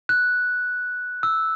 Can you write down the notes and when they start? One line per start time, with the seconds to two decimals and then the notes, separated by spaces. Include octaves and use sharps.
0.09 F#6
1.23 E6